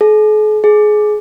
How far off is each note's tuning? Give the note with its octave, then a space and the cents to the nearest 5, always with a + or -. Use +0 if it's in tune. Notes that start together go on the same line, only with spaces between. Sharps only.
G#4 +45
G#4 +20